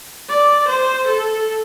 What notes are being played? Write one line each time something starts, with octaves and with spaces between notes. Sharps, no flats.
D5
C5
A4